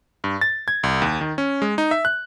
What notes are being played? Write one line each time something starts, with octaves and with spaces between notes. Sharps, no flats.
G2
A6
G#6
C2
D#2
D#3
C#4
G#3
D#4
E5
F#6